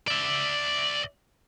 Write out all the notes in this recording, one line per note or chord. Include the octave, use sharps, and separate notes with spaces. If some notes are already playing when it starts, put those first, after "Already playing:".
D5 E5